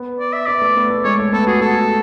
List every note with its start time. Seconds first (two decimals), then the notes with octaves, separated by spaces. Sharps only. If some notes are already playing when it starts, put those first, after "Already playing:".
Already playing: B3
0.20 D5
0.33 E5
0.46 B3 D5
0.62 A3
0.76 B3
0.90 A3
1.04 G#3 C#5
1.19 A3
1.33 B3 A4
1.47 F#4 G#4
1.61 F#4 A4